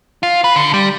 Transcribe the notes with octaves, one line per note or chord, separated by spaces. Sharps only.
F4
B4
D3
G3